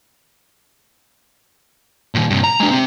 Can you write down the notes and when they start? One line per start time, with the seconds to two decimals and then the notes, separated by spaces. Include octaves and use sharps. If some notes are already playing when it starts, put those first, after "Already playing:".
2.15 A#2 D#3
2.30 G2 C3
2.44 A#5
2.60 G#3 D4
2.71 C3 C4